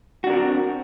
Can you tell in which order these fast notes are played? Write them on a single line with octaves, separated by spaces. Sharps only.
F#4 D4 A#4 C4